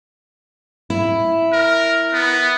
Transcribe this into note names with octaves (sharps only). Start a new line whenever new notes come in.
E4
A#4
B3